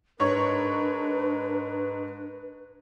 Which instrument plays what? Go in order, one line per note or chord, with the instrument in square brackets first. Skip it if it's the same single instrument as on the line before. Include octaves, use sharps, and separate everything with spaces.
[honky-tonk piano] G#2 C#5 C#6 [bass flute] D4 [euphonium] A#4 [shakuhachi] B4